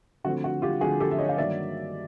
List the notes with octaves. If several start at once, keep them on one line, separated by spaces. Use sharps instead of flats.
D3 F3 A3 C4 F#4
F#4
F4 G4
D3 F3 A3 C4 F#4 G#4
G4 A4
E5
C#5 D#5
F5
G2 D#3 F#3 A#3 D5 E5